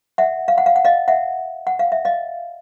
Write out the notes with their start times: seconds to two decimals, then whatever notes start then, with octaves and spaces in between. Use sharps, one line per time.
0.18 E5 F#5
0.48 F5
0.58 F#5
0.66 F5
0.76 F#5
0.85 D#5 F5
1.08 E5 F#5
1.67 F#5
1.79 F5
1.92 E5
2.05 D#5 F5